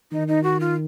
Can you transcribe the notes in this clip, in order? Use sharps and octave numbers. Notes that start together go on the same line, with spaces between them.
D#3 D#4
D#4
F#4
F4